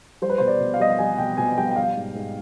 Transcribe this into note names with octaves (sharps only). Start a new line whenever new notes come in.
G3 C5
B4
B2 C5
D5
B2
F5
G3 D#5
F5
G3 G#5
B2 G5
B2 G#5
G3 G5
G5
G3 F5
G#2
G#2